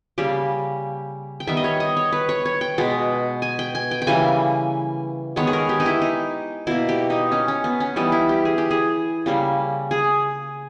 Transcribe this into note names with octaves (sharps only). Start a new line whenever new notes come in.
C#3 G3 A#3 G4
G5
D#3 G3 B3 E5
D#5
C#5
D#5
C#5
B4
C#5
C#5
G5
B2 G#3 B3
G#5
G5
G#5
G5
G5
C#3 E3 G3 A#3 G#5
D#3 G#3 B3 C#5
G#4
A#4
G4
D#4
E4
D#4
B2 A#3 E4
G4
D#4
C#4
C#4
B3
C#4
E3 G3 B3 D#4
E4
G4
G#4
G4
G#4
C#3 G3 A#3
G#4